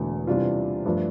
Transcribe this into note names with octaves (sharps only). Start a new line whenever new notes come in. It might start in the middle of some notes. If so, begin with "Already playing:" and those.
Already playing: E1 E2 D3 A3
E2 C3 G3 D4 F4
G2 F3 A3 D4